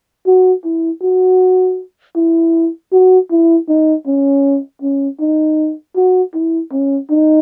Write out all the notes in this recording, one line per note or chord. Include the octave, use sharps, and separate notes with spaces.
F#4
E4
F#4
E4
F#4
E4
D#4
C#4
C#4
D#4
F#4
E4
C#4
D#4